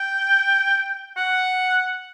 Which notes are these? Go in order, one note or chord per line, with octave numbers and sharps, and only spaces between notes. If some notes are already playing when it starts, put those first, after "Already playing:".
Already playing: G5
F#5